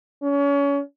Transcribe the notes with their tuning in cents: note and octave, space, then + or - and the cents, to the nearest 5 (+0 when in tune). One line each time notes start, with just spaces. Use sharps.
C#4 +30